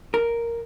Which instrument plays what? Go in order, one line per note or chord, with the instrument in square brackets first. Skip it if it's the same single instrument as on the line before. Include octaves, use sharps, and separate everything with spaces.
[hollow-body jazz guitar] A#4